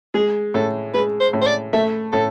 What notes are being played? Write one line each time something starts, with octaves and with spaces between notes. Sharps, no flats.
G#3 G#4
A2 A4
G#3 B4
C5
A2
C5
D5
A3 E5
A2 A4